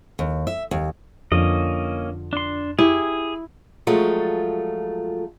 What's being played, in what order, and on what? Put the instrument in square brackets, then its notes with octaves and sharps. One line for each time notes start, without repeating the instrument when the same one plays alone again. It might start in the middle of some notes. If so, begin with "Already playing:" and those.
[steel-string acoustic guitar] D#2
E5
D#2
[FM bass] F2 [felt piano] D3 F3 [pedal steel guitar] A#3 C#4 D#5
[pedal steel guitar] D4 C6
[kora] E4 [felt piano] G4 [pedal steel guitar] G#4
[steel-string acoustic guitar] F3 F#3 G#3 A3 F4